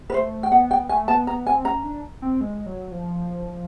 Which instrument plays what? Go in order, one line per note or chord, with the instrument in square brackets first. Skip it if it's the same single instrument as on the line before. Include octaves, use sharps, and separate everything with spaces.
[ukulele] B4
[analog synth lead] A3 [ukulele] C5
[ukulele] G5
[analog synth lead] B3 [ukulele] F#5
[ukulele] G5
[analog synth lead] A3 [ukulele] G#5
[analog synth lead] B3 [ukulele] A5
[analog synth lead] B3 [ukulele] A#5
[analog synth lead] C4 [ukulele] G#5
[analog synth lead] C#4 [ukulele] A#5
[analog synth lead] D4
C4
G#3
F#3
F3